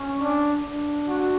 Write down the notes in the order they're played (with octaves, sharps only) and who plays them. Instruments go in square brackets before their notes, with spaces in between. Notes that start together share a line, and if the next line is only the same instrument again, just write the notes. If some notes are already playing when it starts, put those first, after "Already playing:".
Already playing: [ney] C#4
[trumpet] D4
[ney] D4
[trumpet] F#4